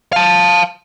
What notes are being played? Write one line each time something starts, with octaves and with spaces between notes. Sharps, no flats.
F5 A5